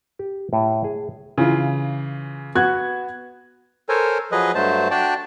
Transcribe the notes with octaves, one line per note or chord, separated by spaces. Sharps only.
G4
A2
G#4
C#3 E3 F4
B3 F#4 F#6 G#6
A4 A#4 C5 C#5 G#5
F3 F#3 G#4 B4 D#5
G2 F#3 A3 C5 A5
D4 F#4 D5 G5 A5